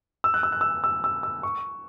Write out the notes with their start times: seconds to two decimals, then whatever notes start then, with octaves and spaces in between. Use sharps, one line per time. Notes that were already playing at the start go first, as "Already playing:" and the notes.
0.24 E6
0.34 F#6
0.43 E6
0.52 F#6
0.61 E6
0.84 E6
1.04 E6
1.23 E6
1.43 C#6